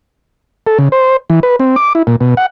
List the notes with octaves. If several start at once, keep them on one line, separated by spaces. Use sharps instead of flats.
A4
C#3
C5
E3
B4
C4
D6
E4
A#2
B2
F#5